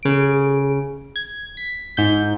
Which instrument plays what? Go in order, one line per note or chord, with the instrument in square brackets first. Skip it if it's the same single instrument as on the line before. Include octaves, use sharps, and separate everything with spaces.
[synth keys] C#3 D7
G#6
B6
G#2 G6